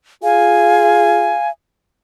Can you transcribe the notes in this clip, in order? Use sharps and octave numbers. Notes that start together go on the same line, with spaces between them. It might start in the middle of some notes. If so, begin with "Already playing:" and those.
F4 G#4 F5 G#5